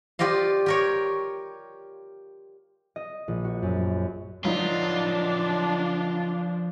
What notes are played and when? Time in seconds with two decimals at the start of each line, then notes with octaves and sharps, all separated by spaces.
0.19 F4 G4 D5 D#5 F5
0.66 G4 A#4 C#5
2.96 D#5
3.28 A#1
3.44 F#4
3.62 F#2
4.45 F3 F#3 D4 D#4 F4 B4